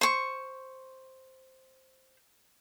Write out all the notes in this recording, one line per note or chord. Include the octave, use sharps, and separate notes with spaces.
C5 C#6